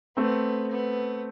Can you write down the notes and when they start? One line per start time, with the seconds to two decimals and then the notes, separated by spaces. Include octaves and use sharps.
0.17 A3 B3 C4
0.71 B3